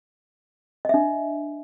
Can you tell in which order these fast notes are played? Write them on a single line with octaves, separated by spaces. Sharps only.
D#5 E5 D4